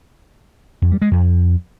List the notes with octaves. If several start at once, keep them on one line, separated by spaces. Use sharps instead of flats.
F2
G3
G#3
F2